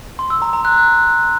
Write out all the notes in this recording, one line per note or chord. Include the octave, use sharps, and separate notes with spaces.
C6
E6
A#5
A#5
F#6